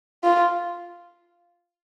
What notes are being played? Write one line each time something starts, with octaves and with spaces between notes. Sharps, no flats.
F4